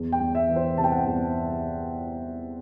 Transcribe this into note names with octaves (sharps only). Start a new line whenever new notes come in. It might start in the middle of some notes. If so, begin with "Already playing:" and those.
Already playing: E2
G5
E2
E5
E3
C5
C3 A5
G5
F#5
G5
E2